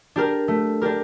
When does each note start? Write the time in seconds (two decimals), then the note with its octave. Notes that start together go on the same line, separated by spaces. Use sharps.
0.16 D4 G4 A#4
0.48 A3
0.82 D4 G4 A#4